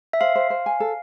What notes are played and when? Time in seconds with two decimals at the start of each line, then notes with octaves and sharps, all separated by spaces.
0.13 E5
0.21 C5 F5
0.35 C5
0.50 C5
0.66 G#5
0.80 A4